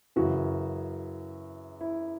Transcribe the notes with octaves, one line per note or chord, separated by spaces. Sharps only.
F#2 C#3 E3 F#4
E4